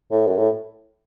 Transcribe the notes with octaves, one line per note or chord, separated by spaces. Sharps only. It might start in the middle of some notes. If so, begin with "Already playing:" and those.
A2
F#2
A2